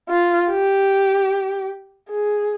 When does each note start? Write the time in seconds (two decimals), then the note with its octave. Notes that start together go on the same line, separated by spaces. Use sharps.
0.09 F4
0.50 G4
2.10 G#4